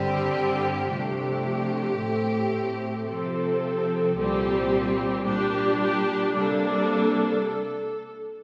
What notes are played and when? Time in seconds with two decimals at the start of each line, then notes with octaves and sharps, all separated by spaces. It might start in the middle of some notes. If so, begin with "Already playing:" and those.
Already playing: G2 D3 G3 C4 G4
0.89 C3 F3 A3 D4 G4
1.99 A2 A3 C4
3.08 C3 F3 C4 A4
4.17 C2 A#2 G3 C4 G4
5.26 A#2 G3 D4 G4
5.81 G4
6.35 C3 G3 A#3 D4 A4